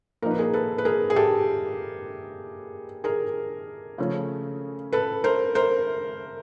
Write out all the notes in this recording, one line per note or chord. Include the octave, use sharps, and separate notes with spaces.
A#2 F3 A#3 D#4 A#4
B4
G#4 A#4
A4 B4
B4
G#4 A#4
G#4
G4 A4
G#4 A#4
C#3 F3 A3 C#4
A4 B4
A#4 C5
A#4 C5